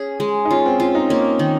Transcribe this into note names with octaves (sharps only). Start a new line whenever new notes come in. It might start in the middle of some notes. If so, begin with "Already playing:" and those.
Already playing: C#4 G#4
G#3
D#4
C#4 F4
C4
C#4 F4
D#4
A#3 C#4
D#3